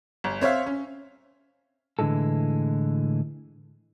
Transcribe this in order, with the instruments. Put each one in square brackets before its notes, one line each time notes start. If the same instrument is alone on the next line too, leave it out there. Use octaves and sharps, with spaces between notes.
[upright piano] G1
C4 C#5 E5 F5
C#4
[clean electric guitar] A2 D3 E3 G#3 A4